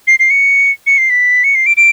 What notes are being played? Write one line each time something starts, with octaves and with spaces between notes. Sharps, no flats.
C7
C7
C#7
C#7
C7
B6
C#7
C7
D7
D7